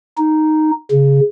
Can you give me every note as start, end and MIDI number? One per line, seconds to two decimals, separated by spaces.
0.17 0.71 63
0.91 1.20 49